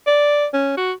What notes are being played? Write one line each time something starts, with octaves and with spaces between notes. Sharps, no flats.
D5
C#4
F#4